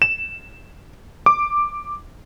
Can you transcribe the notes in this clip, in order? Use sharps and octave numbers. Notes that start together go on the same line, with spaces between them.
E7
D6